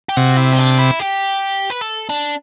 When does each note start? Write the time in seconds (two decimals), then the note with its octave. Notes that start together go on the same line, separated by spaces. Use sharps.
0.09 G4
0.17 C3 F#4
0.37 E4
0.53 C4
0.59 D4
0.78 E4
1.00 G4
1.70 B4
1.82 A4
2.09 D4